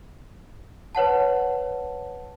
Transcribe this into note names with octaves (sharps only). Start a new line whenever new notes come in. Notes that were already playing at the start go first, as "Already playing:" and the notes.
B4 C#5 F#5 A5